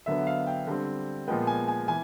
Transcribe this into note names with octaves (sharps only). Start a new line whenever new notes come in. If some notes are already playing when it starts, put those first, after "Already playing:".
D3 F#3 B3 E5
F5
G5
D3 G3 C4
A#2 F3 G#3 B3 G5
G#5
G#5
E3 G#5